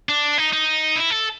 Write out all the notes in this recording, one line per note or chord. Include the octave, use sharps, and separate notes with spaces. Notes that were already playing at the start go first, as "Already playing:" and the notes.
D4
D#4
D#4
E4
A4